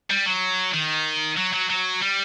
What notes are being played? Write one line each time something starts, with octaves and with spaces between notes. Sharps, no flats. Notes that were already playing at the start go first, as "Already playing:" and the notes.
G3
F#3
D#3
F#3
F#3
F#3
G3